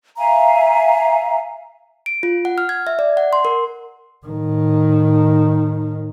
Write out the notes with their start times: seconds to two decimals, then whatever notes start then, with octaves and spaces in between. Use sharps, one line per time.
0.17 E5 F5 G#5 A#5
2.06 D7
2.23 F4
2.45 F#5
2.58 F6
2.69 G#6
2.87 E5
2.99 D5
3.17 F#5
3.33 C6
3.45 A#4
4.26 A2 D#3